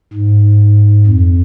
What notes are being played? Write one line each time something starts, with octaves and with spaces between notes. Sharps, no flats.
G#2
F2